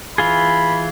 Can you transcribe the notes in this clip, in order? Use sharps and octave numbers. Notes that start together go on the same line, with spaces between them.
E3 F4 G#4 B5